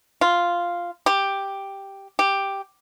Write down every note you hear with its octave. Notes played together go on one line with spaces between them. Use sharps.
F4
G4
G4